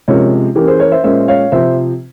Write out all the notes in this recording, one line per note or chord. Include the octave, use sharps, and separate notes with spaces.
C3 F3 G#3 C#4 A#4 C#5
E3 A#3 C#4 G4 A#4
G#4 C5
A#4 C#5
C5 E5
A#2 G#3 C#4 C5 E5
C#5 F5
C3 F3 C4 C5 E5